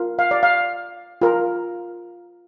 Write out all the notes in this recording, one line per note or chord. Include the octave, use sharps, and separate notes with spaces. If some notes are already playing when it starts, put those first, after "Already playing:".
Already playing: F4 A#4
F5
D5
F5
F4 A#4